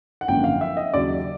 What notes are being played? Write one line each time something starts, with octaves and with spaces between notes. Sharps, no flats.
F#5
G#1 F#2 D3 F3 A#3 G5
F5
E5
D#5
D#2 C#3 F#3 D5